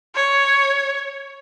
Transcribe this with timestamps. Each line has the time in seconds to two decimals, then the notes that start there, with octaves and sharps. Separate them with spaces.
0.15 C#5